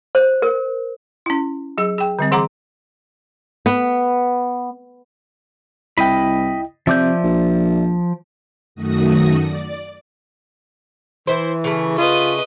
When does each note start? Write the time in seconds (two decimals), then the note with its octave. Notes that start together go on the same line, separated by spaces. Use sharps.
0.15 C5
0.42 A#4
1.26 C#4 E4
1.78 F#3 G#4
1.98 G#4 G5
2.19 D3 G3 C4
2.32 E3 G#4 F#5 A#5 C6 D6
3.66 B3
5.98 C2 E4 D#5 G5 B5
6.87 C3 F3 D5 E5 D6 G6
7.24 A#1
8.75 F#2 D#3 A3 F#4 D#6 A#6
9.40 D5
11.27 E3 E4 C5
11.64 C#3 A3
11.98 F4 B4 D#5